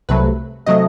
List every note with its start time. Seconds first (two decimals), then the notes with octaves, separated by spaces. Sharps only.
0.09 C2 C3 F#3 A3 B4
0.66 C3 F#3 A3 D#5